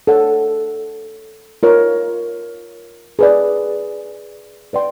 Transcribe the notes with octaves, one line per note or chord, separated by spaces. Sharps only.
A4 C#5 F#5
F4 A#4 C#5
G#4 B4 D5
B4 D5 G5 C6